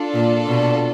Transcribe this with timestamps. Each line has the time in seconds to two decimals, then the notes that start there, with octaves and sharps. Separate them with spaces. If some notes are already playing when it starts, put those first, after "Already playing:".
Already playing: D4 F4 A4 D5
0.14 A#2
0.48 B2